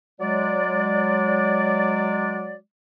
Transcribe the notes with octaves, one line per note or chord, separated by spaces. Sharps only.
F#3 G#3 D5